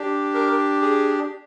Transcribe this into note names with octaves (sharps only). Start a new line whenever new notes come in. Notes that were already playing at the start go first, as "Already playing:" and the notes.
Already playing: D4 G4
A#4
G#4